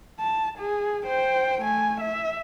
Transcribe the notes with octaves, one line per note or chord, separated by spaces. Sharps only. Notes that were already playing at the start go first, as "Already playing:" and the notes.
A5
G#4
C5 G5
A3 G#5
E5